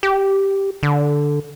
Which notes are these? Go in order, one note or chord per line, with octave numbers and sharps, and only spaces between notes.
G4
D3